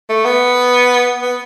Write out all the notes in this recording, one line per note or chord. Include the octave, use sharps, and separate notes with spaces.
A3
B3
B3